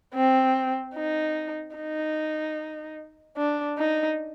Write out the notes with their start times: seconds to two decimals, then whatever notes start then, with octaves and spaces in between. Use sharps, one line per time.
0.14 C4
0.95 D#4
1.76 D#4
3.37 D4
3.78 D#4